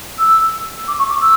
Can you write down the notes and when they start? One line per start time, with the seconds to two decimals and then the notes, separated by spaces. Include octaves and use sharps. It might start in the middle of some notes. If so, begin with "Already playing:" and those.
0.18 E6
0.88 D6
0.99 C#6
1.09 D6
1.21 E6